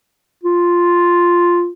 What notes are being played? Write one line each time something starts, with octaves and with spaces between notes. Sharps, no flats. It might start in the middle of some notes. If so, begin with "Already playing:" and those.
F4